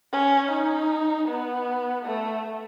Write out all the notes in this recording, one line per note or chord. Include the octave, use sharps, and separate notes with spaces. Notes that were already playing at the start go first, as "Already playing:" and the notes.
C#4
D#4
B3
A3